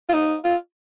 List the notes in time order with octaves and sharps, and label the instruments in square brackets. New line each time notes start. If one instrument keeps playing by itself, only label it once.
[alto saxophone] F4
D#4
F4